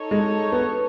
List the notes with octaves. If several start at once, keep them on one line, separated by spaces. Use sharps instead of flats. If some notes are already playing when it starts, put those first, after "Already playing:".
Already playing: D#4 A4 C#5
G#3
B3